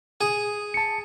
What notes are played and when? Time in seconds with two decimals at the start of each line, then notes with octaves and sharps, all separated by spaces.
0.21 G#4
0.74 A5 C#7